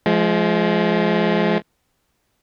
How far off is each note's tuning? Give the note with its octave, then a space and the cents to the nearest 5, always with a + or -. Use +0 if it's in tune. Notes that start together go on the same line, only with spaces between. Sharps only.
F3 -10 G#3 +25